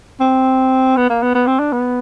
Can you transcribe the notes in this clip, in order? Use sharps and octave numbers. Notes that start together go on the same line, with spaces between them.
C4
B3
A#3
B3
B3
C4
D4
B3